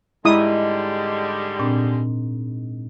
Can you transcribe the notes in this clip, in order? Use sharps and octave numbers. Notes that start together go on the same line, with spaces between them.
G#2 D3 G3 G#3 E4 D#6
A#2 C4 D4